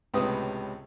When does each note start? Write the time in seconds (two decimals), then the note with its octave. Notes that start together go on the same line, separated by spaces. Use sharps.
0.14 C#2 A2 C3 B3 D#6